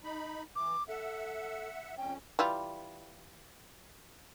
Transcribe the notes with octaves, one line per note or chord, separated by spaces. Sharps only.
D#4 B5
E3 D6
A4 E5 F#5
F2 C#4 G5
E3 G3 F4